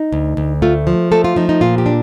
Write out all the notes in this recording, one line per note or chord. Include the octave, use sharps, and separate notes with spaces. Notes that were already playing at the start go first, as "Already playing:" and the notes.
Already playing: D#4
D2
D2
A3 F4
F3
A3 A4
F4
F3 D#4
D#4
A#2 F4
G4
D4